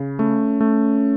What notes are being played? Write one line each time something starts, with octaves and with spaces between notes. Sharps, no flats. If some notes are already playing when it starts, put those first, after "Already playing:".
Already playing: C#3
A3 C#4
A3